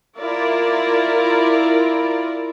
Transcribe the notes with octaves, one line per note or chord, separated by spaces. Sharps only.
E4 F4 A#4 D5